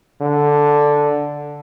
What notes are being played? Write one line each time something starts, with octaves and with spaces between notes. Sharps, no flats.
D3